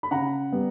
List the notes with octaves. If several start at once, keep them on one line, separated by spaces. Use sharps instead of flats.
B5
C#3 F#5 A#5
G3 B3